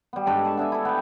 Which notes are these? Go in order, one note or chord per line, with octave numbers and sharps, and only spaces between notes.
G3 B3
G#2 D4 A4 B5
A5 C#6
B3 D4 E5 G#5
E4 A4
B3 G5